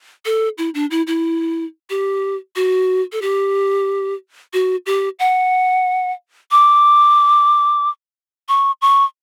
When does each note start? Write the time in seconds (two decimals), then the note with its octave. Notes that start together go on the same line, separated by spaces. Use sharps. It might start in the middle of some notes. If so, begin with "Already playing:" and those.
0.25 A4
0.58 E4
0.74 D4
0.91 E4
1.07 E4
1.90 G4
2.56 F#4
3.12 A4
3.22 G4
4.53 F#4
4.86 G4
5.19 F#5
6.51 D6
8.49 C#6
8.82 C#6